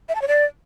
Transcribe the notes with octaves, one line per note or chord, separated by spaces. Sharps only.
E5
A5
C#5
D5